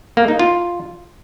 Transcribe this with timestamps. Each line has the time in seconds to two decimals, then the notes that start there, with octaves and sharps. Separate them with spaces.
0.17 A#3
0.28 D#4
0.39 F4